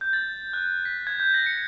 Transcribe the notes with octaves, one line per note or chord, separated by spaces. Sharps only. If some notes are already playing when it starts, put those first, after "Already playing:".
G6
A6
F#6
B6
G#6
G6
A#6
C#7